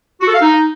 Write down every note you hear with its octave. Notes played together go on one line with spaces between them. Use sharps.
F#4
A4
F5
D#4